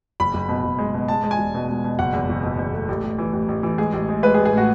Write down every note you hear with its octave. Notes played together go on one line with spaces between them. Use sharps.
F#1 B5
F#1
B2
F#1
G#3
B2
G#3 A5
G#3
G#5
E1
B2
B2
B2
F#1 F#5
E2
F#1
B2
E2
A3
A1
A1
E3
A1
A1
E3
G#3 G#4
A1
G#3
G#3 B4
G#4
A1
G#4
A2 F#4